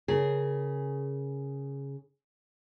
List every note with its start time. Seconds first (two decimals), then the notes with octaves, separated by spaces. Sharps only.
0.08 C#3 G#4 A#4